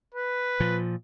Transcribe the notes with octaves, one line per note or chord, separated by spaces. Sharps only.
B4
A#2 F3